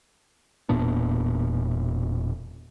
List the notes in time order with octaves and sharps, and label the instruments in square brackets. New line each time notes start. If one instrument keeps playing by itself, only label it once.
[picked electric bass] E1 A#2 B3 D4